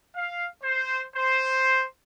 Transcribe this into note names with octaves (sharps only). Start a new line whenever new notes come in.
F5
C5
C5